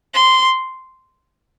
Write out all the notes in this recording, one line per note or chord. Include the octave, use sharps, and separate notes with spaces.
C6